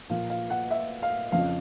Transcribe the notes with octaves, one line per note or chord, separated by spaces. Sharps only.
A#2 F3 F5
F5
F#5
E5
F5
F2 C#3 F3 F5